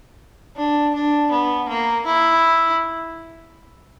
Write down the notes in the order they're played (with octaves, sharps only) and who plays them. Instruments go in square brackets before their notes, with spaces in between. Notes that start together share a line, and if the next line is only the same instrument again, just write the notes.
[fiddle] D4
D4
B3
A#3
E4